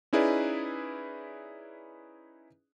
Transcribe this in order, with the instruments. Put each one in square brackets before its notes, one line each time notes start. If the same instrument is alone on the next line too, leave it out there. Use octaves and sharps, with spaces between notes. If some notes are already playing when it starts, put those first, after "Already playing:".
[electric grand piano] C#4 D#4 E4 G#4 B4 D5